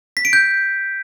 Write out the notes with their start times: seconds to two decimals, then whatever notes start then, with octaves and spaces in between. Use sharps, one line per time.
0.17 B6
0.25 D7
0.33 G6